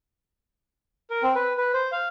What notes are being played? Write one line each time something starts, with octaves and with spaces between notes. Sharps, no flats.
A#4
C4
B4
B4
C5
F5